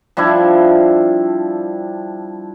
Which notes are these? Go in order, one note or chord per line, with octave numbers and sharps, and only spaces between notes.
F3 G3 D4 E4